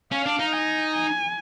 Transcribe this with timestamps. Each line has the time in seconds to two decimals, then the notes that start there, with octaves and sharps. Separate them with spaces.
0.12 C#4 F5
0.26 D4
0.39 D#4
0.53 G#5
0.94 G#5